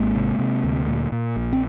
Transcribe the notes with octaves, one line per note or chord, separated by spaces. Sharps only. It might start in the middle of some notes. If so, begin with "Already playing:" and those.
Already playing: G#1 G#3 A#3
C3
C3
D2
A#2
A#2
A#1
C4